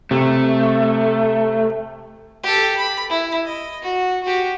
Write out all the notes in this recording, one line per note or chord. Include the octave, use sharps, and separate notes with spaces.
C3 A3
G4 A4
B5
E4
D#5
F#4
F#4 G4